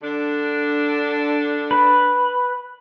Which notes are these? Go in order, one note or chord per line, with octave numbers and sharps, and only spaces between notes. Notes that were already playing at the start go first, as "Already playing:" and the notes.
D3 D4
B4